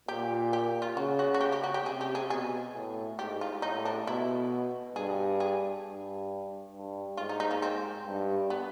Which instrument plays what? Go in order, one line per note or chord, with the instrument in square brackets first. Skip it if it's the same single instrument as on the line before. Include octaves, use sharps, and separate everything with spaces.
[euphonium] A#2 [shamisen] G4
[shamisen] G4
F4
[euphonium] C#3 [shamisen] F#4
[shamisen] F#4
F#4
G4
G4
F#4
G4
[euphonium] C3 [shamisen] G#4
[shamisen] G4
G#4
[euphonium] B2 [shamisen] G#4
[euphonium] A2
[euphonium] G#2 [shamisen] G4
[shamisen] F4
[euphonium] A2 [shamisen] D#4
[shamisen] D4
[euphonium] B2 [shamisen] E4
[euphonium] G2 [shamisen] G#4
[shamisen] G#4
[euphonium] G2
G2
[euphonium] G#2 [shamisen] F4
[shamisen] D#4
D#4
A#3
C4
[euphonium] G2
[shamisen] B3